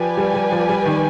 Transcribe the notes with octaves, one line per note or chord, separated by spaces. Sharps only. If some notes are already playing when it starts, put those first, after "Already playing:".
Already playing: F3 G4 B4 D5 G#5
G3
G3
F3
G3
D#3